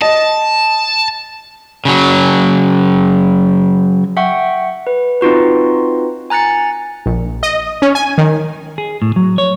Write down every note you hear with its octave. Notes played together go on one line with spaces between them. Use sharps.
D#5 A5
C#3 F#3
E5 F#5 G5 C#6
B4
C4 D#4 F4 F#4 B4
G#5 A#5 F#6 A6 C#7
A#1
D#5
C#4
G#5
D#3
G#4
A2
F#3
C#5